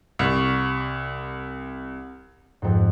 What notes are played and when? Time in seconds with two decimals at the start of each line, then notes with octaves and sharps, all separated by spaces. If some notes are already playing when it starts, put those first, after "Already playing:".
0.19 C2 C#6 D6
2.62 F2 G#2